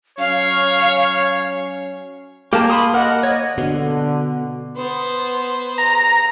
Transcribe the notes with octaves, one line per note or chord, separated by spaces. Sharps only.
F#3 C#4 C#5 F5
A#3 G4 A5
B5 C6 D#6
A#4 D#5 F#5
C#5 D#5
B2 D3
B3 C5
A#5